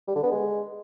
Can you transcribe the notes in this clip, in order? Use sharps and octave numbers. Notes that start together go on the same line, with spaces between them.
G3
D3
B3
G#3